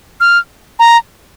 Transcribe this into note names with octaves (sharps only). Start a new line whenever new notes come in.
F6
A#5